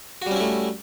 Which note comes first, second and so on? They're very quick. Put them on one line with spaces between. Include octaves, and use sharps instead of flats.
F#4 G3 C#4 E4 A3